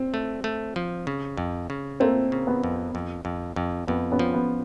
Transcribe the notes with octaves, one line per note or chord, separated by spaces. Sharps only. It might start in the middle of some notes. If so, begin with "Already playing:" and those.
Already playing: C4
A3
A3
F3
C#3
F2
C#3
A3 A#3 C4
C#3
B3
F2
F2
F2
F2
F2 B3
B3 C#4
F3
B3